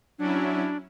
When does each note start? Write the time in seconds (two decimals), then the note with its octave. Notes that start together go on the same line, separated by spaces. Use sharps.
0.19 F#3 C#4 D4 E4